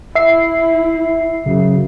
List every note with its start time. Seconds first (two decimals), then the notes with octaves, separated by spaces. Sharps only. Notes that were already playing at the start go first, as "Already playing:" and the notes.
0.15 E4 E5 C7
1.46 F#2 C#3